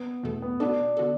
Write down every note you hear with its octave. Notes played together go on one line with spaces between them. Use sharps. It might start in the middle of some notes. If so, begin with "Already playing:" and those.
Already playing: B3
E2 B2 A3 E4 A4
B3
B2 B3 D4 F#4 A4
D3 B3 F#4 A4